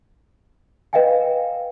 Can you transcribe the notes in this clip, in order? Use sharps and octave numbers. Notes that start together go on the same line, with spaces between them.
B4 D#5 F5 G5 G#5